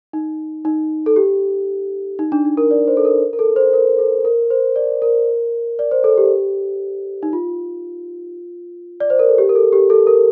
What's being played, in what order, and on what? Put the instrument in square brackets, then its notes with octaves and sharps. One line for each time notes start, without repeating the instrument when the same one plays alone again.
[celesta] D#4
D#4
A4
G4
D#4
D4
D#4
A#4
D5
C5
A4
A#4
A#4
A4
C5
A#4
A4
A#4
C5
D5
A#4
D5
C5
A4
G4
D#4
F4
D5
C5
A#4
A4
G4
A#4
A4
G4
A4
A#4